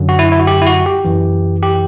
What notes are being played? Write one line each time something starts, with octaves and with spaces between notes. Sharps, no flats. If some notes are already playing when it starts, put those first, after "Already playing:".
Already playing: F#2 D3 F#3
F#4
E4
E4
F#4
G4
E4
F#4
G4
F#2 E3
G4